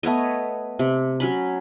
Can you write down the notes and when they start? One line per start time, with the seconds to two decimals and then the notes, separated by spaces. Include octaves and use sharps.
0.03 A3 B3 C#5 D#5
0.79 C3
1.20 F#3 C#4 B5